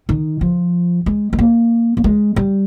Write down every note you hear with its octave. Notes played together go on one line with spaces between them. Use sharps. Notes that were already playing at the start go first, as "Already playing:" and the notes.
D#3
F3
G#3
G#3
A#3
A#3
G#3
G3